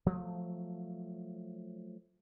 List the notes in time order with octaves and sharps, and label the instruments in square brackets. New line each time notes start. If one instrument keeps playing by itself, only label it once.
[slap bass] F3 F#3 A3